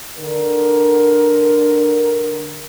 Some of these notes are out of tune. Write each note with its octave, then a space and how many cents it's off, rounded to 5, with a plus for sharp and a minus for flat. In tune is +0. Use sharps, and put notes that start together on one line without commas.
D3 +15 A#4 +15